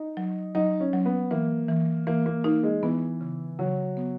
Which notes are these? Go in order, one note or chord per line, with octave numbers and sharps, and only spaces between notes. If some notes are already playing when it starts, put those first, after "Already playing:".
Already playing: D#4
F#3
F#3 D#4
C#4
F#3
B3
E3 A#3
E3
E3 A#3
A#3
A#3 D#4
G#3
E3 B3
C#3
C#3 F#3
B3